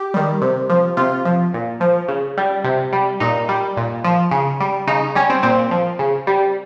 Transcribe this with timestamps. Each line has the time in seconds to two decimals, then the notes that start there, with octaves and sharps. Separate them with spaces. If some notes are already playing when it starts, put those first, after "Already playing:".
Already playing: G4
0.14 D#3 G3
0.41 C3
0.70 F3
0.97 C3 F4
1.25 F3
1.54 A#2
1.80 F3
2.08 C#3
2.37 G3
2.64 C3
2.93 G3
3.20 A#2 D#4
3.49 G3
3.77 A#2
4.04 F3
4.31 C#3
4.60 G3
4.87 C#3 D#4
5.15 G3 C#4
5.30 C4
5.43 A#2 C4
5.71 F3
5.99 C#3
6.27 G3